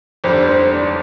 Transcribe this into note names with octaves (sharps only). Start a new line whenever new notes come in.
G1 F2 D3 G3 D4 C5
C5
D5